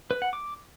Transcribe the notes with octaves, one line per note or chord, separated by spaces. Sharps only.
B4
F#5
D6